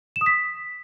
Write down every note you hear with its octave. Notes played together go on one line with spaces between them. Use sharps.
E7
D#6
B6